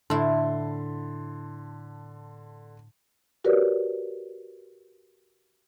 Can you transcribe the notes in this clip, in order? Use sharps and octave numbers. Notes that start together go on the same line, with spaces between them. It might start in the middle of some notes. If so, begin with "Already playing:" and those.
A2 D3 E4 A5 C6
F#4 G4 A#4 B4 C#5 D5